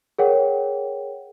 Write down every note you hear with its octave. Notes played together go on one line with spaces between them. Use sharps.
G#4 A#4 C#5 F#5 G5